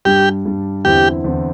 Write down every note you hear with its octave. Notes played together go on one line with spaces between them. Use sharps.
G2 G3 D4 G4
G2 G3 D4
E2 D3 C4 E4 G4
E2 D3 C4 E4